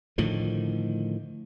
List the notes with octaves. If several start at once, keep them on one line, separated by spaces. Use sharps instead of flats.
A2 D3 D#3 F3